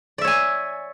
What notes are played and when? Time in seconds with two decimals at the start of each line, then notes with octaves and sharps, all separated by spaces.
0.18 D5
0.21 E5
0.24 C#5
0.28 G#5